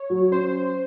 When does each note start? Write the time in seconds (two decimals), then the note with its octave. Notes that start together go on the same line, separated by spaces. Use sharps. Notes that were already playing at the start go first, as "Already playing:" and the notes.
Already playing: C#5
0.10 F#3
0.31 C#4 C5